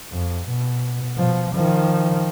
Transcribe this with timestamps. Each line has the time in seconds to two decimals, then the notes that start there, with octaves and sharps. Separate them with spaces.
0.12 F2
0.49 B2
1.18 B2 F3
1.55 D#3 F3